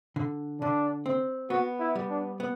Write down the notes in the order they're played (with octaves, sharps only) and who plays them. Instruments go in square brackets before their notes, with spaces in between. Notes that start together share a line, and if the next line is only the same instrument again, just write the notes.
[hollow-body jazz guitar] D3
[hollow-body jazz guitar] D3 [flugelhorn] D4
[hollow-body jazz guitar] C4
[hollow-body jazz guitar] B3 [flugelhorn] F#4
[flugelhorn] E4
[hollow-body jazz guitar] G3
[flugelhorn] D4
[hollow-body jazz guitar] B3